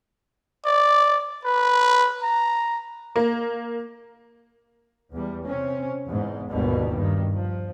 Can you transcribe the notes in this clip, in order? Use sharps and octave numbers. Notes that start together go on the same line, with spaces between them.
D5
B4
A#5
A#3
E2 G3
C3 C4 C#4
E2 G#2
G1 D#2 G#2 B2 D3 G3
G2 D#3
F3